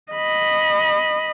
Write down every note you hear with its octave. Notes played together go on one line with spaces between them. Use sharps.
D#5 B5